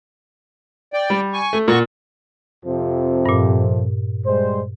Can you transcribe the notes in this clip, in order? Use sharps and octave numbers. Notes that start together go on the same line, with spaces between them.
D5 G5
G3
G#5 C#6
A3
A#2 F#4 C#6
F2 C3 F3
G2 A#2
G3 G#3 C5